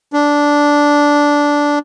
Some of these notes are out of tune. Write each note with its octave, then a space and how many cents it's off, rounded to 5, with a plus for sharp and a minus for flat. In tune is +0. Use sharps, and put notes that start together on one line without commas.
D4 -10